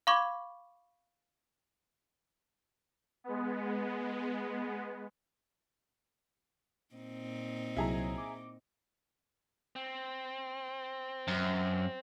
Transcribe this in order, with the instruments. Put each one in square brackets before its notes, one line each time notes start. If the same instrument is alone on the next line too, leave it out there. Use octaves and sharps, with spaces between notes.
[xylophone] F5 B5 C#6 D6 G#6
[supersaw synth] G#3 B3
[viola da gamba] A#2 C4 D#4
[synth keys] C2 C3 F#3 [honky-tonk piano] E4 G#4 A#5
[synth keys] D6
[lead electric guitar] C4
[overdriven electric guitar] F#2